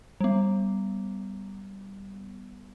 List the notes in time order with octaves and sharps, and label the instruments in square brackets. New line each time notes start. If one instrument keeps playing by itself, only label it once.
[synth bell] G3 B3